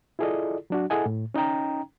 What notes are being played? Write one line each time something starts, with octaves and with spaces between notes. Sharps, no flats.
E4 F4 G#4 A4 D5 D#5
F#3 D4 F#4
E4 G#4 A4 D#5 F#5 G#5
A2
C#4 D#4 D#5 G5 A#5